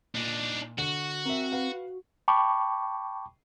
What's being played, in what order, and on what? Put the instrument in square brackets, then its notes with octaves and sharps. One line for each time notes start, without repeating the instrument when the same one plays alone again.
[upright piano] A#2 [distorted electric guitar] D4 D#4
[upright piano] D3 C#7 [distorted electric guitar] F#4
[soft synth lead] C4 [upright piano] A#4 E5
[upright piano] B4 F5 F#5
[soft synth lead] F#4
[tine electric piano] G5 A5 B5 C#6 D6